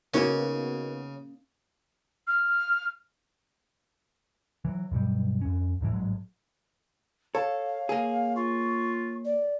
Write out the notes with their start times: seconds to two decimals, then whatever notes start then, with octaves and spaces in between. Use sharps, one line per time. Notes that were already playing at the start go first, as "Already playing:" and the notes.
0.14 C#3 A#3 B3 C#4 D#4 F#4 A#4 C#5
2.27 F6
4.65 E3 F#3
4.91 G2 B2 F#3 G3
5.41 F2 C#4
5.81 F2 A2 D#3 E3
5.93 A1 G#2 F#3 G#3
7.35 A4 C#5 F5
7.89 A#3 G#4
8.36 F4 C#6
9.25 D5